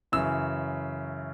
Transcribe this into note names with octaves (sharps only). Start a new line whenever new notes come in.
F#2 C#3 E3 E6